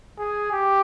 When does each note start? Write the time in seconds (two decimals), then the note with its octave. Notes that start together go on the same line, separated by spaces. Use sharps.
0.19 G#4
0.52 G4